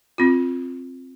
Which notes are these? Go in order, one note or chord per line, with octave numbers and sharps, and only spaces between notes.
C4 F4